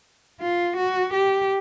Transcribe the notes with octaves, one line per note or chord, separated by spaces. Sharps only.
F4
F#4
G4